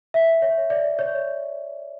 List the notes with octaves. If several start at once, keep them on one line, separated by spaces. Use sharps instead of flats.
E5
C#5
D5
C#5